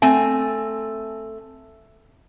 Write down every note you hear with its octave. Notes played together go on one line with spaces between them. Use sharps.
A3 C4 G#5